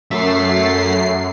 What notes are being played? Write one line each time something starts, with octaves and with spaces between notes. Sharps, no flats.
F#2 A4 E5 C7